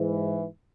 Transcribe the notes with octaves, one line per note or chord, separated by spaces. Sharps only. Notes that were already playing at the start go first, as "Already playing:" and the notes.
Already playing: G#2 E3